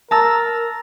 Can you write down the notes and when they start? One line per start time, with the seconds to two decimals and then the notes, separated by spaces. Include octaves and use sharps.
0.11 A#4 A5 A#5 E6